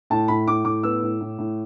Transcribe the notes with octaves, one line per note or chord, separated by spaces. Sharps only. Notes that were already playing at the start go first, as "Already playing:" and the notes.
A2 A5
A2 B5
A2 D6
A2 D6
B3 E6
A2
A2
A2